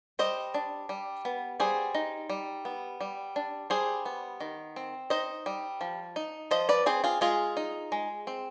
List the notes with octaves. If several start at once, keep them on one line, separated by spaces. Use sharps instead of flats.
G3 C5 D#5
D4
G3
B3
G3 G#4 C5
D#4
G3
B3
G3
D4
G3 G#4 C5
B3
D#3
C4
D#4 C5 D#5
G3
F3
D#4
F3 C5 D#5
B4 D5
C4 G#4 C5
F4 G#4
G#3 F4 G#4
D#4
G#3
C4